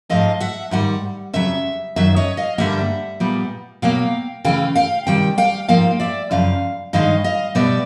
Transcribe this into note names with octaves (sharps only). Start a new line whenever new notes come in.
G#2 F3 A3 D#5 F5
E5 F#5
G#2 D#3 G3 F#5
F2 C#3 F#3 E5
F#2 D#3 F#3 E5
C#5 D#5
D#5 F5
G2 D3 G3 A#3 E5 F#5
A#2 G3 B3
B2 F#3 A#3 F5 G5
C#3 E3 A3 F5 G5
F5 G5
C3 D#3 G3 G5
F5 G5
G#2 F3 A#3 F5 G5
D5 E5
F#2 C#3 F3 F5
G2 D#3 G#3 D#5 F5
D#5 F5
B2 G3 B3 D5 E5